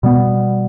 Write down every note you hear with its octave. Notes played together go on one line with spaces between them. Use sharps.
B2 G3 B3